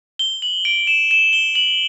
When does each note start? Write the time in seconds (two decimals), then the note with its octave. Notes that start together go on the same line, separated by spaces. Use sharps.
0.19 G7
0.42 F#7
0.65 D7
0.87 E7
1.11 E7
1.33 G7
1.55 F#7